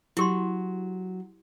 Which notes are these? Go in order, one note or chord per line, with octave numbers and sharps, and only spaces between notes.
F#3 E4 G4 C6